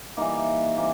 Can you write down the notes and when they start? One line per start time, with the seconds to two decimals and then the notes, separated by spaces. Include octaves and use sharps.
0.17 E3 G3 A#3 D#4
0.76 C3 E3 G3 A#3